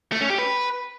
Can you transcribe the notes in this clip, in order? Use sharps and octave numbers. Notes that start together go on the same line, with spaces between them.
A3
C#4
G4
B4